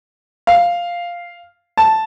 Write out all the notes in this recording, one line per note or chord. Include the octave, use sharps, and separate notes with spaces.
F5
A5